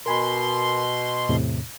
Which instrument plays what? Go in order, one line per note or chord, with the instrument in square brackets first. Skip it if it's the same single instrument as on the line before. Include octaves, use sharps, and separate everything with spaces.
[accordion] B2 C6 [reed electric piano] A#4 G#5 B5
[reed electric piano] E2 A2 C3